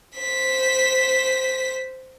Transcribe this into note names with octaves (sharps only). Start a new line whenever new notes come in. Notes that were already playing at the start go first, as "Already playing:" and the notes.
C5 B6